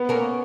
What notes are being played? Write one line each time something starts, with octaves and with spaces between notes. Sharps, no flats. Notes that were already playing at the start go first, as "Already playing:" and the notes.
Already playing: B3
A#3 C#4